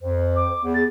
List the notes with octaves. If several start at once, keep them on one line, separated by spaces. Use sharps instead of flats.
F2 C5
D6
E2
G#4 A6